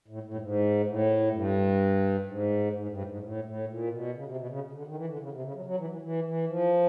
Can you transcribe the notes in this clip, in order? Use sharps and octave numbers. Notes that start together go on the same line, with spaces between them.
A2
A2
G2
G#2
A2
G2
G#2
G#2
G2
A2
G#2
A2
A2
A#2
B2
C#3
C3
B2
C#3
D3
D#3
E3
D3
C#3
C3
C#3
F#3
F#3
E3
E3
E3
E3
F3